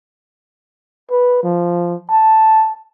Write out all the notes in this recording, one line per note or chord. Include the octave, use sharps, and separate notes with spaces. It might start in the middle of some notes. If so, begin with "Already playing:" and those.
B4
F3
A5